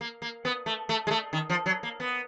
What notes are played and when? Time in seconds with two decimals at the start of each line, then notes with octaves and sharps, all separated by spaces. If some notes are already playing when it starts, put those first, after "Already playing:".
0.01 A#3
0.22 A#3
0.45 B3
0.66 A3
0.89 A3
1.07 G#3
1.11 A3
1.33 D#3
1.50 F3
1.66 F#3
1.83 A#3
2.00 B3